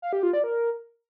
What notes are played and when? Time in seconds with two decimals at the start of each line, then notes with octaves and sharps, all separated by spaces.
0.02 F5
0.13 G4
0.23 F4
0.33 D5
0.44 A#4